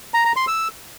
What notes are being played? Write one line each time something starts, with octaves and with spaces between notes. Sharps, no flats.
A#5
A#5
C6
E6